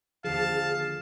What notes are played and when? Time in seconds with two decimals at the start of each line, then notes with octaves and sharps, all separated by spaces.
0.24 D#2 D3 F3 G#4 F5 A5